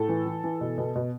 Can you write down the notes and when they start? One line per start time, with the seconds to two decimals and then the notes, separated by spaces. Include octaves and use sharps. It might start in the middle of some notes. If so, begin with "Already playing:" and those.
Already playing: A2 A4
0.09 E3
0.26 E3
0.44 E3
0.61 B2
0.78 B2
0.95 B2